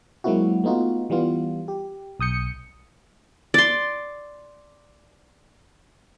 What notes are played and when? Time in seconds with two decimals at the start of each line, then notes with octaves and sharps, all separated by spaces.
0.24 F#3 G#3 A#3 C4 E4 F#4
0.64 A3 B3 D#4 F4 F#4
1.10 E3 G3 B3 F4
1.68 G4
2.20 B1 D#6 G6 C#7
3.54 D5 C6